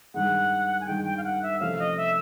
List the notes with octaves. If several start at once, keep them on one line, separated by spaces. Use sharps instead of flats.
G2 D#3 G#3 F#5
G#5
G2 D#3 G#3 G5
G5
F5
F#5
E5
C3 F3 A3 C#4 F5
D#5
E5